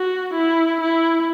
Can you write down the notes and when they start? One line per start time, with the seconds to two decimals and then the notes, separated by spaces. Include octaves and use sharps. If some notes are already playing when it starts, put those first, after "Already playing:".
Already playing: F#4
0.33 E4
0.81 E4